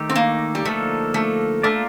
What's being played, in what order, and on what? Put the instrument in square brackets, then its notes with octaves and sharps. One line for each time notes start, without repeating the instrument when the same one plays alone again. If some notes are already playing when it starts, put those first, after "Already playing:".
Already playing: [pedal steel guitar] D#3 A3 D#4 G4
[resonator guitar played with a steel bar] C4
A#3
G3
[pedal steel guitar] D3 F3 A#3 D#4 A4 [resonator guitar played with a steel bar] A3
[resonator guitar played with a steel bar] A3
[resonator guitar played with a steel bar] A3 [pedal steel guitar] A#3 F4 A#4 D5